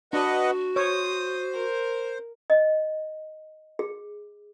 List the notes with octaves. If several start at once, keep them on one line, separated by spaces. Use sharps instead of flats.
D4 F#4 B4 D#5 F#5
C5 C#5 D#6
A#4
D#5
G#4